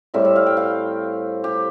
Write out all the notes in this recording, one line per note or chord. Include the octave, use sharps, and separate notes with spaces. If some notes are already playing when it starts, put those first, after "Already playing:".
A2 G3 C4 E5
E5
F5
G5
F5
G4